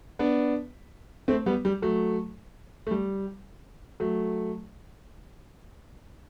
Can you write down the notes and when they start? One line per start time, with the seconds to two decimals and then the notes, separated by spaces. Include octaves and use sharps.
0.19 B3 D4
1.28 A3 C4
1.46 G3 B3
1.65 G3
1.82 F#3 A3
2.87 A3
2.91 G3
4.00 F#3 A3